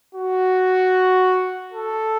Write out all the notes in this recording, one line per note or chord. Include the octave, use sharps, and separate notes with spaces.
F#4
A4